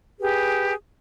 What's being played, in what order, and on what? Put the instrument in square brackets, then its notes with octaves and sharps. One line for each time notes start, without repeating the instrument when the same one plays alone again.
[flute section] G4 G#4 B4